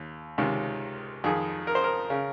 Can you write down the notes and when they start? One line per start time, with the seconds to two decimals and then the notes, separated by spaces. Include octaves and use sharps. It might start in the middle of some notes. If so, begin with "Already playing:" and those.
Already playing: D#2
0.38 C#2 C3 D#3
1.24 F2 D#3 G#4
1.67 A#4
1.75 C5
1.84 A#4
2.10 C#3